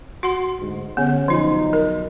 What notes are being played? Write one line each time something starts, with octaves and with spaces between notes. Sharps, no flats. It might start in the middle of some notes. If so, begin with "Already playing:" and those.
F#4 F#5 C6
D2 G#2
D3 B3 C#4
B1 F3 D#4 F4
A#4